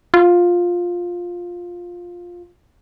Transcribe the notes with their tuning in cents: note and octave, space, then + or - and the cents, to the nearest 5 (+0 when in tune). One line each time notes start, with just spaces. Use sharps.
F4 +10